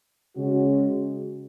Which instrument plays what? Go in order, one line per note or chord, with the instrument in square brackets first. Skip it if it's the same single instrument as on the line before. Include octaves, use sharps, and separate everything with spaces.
[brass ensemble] C#3 G#3 C#4 F#4